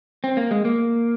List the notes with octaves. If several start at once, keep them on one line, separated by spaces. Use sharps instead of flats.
C4
A#3
G#3
A#3